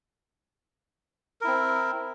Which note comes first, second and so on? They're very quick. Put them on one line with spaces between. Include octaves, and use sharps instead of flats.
A#4 E4 C4